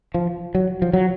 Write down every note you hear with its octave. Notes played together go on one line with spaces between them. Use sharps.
F3
F#3
F3
F#3